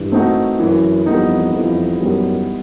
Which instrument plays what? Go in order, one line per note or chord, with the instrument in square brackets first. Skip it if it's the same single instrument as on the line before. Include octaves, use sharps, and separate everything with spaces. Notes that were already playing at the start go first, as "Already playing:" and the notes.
Already playing: [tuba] G2 [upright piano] E3
[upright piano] A3 C4 D#4 F#4
[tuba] F#2 [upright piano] E3
[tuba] F2 [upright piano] G3 B3 D#4
[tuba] F2 [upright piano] E3
[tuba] F#2 [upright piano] G3 B3 D#4